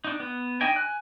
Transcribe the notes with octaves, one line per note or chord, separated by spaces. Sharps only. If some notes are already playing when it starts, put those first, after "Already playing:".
D4 D#4
B3
D4 D#4 D#5 G5 G#5
G#5 F#6